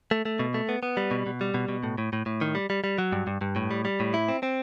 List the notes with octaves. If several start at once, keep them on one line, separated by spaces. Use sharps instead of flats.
A3
A3
B2
A3
B3
B3
G3
B2
B2
G3
B2
B2
A2
A2
A2
A2
D#3
G3
G3
G3
F#3
G2
G2
G2
A2
G3
G3
A2
E4
C4
C4